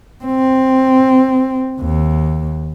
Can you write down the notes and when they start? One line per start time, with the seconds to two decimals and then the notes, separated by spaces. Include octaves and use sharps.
0.24 C4
1.80 D#2